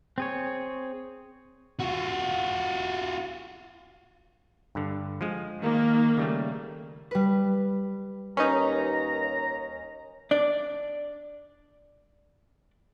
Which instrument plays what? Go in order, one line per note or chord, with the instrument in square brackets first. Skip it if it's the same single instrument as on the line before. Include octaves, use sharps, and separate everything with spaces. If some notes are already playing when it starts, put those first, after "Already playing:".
[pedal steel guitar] C4 G#4 C#5
[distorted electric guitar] F4 F#4
[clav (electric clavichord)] G2 D3
F3 G#3
[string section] D#3 A#3
[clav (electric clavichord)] C#3 G3 A3
[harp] G3 B4
[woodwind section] D#2 A#5 [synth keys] C#4 D#4 [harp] B4
[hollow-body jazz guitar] D4 D5